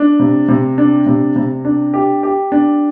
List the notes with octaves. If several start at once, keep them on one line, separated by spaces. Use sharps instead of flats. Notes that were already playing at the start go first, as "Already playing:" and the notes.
Already playing: D4
C3
C3
D4
C3
C3
D4
G4
G4
D4